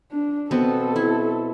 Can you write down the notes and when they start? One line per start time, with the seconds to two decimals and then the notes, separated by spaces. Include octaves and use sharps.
0.11 D4
0.51 B2 B3 C4 A4
0.96 E4